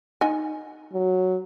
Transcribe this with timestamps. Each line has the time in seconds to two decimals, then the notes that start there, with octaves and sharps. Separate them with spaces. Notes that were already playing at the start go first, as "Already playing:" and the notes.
0.21 D#4 G#5
0.93 F#3